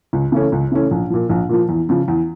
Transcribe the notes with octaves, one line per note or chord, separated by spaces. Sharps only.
C#2
C#3 E3 A3 C#4
C#2
C#3 E3 A3 C#4
A#1
A#2 F3
A#1
A#2 F3
E2
C#3 F3
E2